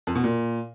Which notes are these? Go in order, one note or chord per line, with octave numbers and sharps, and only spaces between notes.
F2
B2
A#2